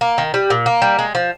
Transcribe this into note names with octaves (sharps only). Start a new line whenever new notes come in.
A#3
D#3
G3
A#2
A#3
G3
G#3
F3